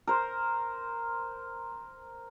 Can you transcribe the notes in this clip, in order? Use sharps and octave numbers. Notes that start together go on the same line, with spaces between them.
A#4 C5